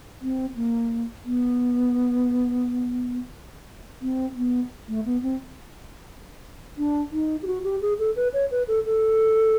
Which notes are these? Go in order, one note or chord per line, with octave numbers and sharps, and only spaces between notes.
C4
A#3
B3
C4
B3
A3
B3
C4
D4
D#4
G4
F#4
G4
G#4
A4
B4
C#5
B4
A4
A4